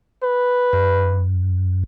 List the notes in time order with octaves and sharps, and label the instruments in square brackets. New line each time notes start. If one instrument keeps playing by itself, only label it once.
[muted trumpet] B4
[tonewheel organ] F#2